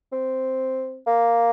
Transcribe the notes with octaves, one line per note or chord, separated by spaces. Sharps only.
C4
A#3